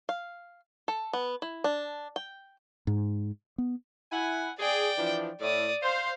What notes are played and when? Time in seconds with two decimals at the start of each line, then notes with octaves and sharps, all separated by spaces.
0.09 F5
0.88 A4
1.13 B3
1.42 E4
1.64 D4
2.16 G5
2.87 G#2
3.58 B3
4.12 E4 F#5 G#5
4.60 G#4 D5 G5
4.98 E3 F3 D4
5.41 A2 D5 D#6
5.83 C5 F5